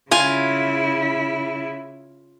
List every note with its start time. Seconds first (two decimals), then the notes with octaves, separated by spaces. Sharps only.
0.11 C#3 E4 F4 G#5